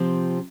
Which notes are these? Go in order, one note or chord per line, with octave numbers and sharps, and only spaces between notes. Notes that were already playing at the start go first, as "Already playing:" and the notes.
Already playing: C3 F3 C4